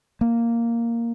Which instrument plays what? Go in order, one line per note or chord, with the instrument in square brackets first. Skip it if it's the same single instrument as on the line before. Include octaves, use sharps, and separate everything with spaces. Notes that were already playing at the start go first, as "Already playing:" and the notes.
[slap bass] A#3